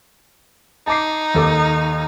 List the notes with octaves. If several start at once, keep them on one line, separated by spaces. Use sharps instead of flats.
D#4 A5 D6 C7
D#2 A4 D6